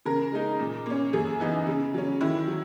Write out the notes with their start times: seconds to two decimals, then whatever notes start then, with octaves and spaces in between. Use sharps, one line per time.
0.05 C#3 A#4
0.32 G#3 D#4
0.59 A#2
0.86 A#3 C#4
1.13 F#2 G#4
1.40 E3 B3 D#4
1.67 C#3
1.94 F#3 C#4
2.21 D#3 E4
2.48 F#3